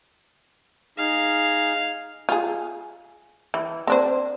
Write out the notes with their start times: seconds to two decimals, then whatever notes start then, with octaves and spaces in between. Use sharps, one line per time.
0.98 D#4 G#4 F5
2.29 F4 G#4
3.54 E3
3.87 C4 D4 C5